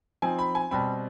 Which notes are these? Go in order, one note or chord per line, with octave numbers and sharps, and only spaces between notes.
F3 C4 D#4 G#5
B5
G#5
B2 G3 C4 B5